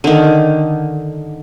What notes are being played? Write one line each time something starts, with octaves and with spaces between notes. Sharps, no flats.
D3 D#3